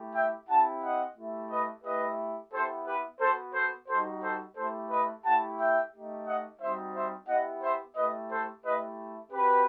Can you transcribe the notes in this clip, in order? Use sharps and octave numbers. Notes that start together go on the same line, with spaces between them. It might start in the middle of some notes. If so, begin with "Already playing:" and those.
Already playing: A3 E4 G4
E5 G5
C4 E4 G4 F#5 A5
D#5 F#5
A3 E4 G4
B4 D#5
A3 E4 G4 B4 D#5
B3 E4 G4 A4 C5
G4 B4
B3 F#4 A4 C5
A4 C5
G3 D#4 F#4 A4 C5
A4 C5
A3 E4 G4 A4 C5
B4 D#5
A3 E4 G4 F#5 A5
E5 G5
A3 D#4 G4
D#5 F#5
G3 C4 D#4 F#4 C5 E5
C5 E5
B3 E4 G4 D#5 F#5
C5 E5
A3 E4 G4 B4 D#5
A4 C5
A3 E4 G4 B4 D#5
C4 F#4 G4 B4